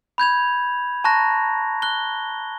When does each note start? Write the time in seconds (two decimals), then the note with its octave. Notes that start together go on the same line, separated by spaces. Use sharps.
0.18 B5 G6 G#6 F7
1.04 A5 A#5 C#6 F#6 A#6
1.82 F#6 G7